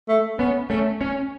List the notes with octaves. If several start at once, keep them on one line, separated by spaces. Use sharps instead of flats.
A3
B3 C#4
A3 C#4
C#4